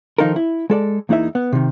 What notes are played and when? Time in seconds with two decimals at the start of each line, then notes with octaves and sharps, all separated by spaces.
0.18 D#3 F3 D#4 F4 A4 A#4
0.36 E4
0.70 G#3 A4 D5
1.09 E2 A#3 D#4 E4 E5
1.35 B3
1.53 C3 D#3